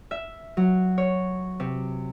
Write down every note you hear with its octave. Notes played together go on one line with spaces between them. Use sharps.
E5
F#3
C#5
C3